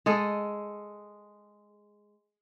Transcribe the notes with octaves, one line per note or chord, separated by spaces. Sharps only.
G#3 G#4 A4